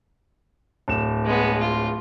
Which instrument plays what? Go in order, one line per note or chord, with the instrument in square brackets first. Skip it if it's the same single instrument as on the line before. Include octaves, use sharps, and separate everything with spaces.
[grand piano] D1 E7
[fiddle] G#3 B3
F4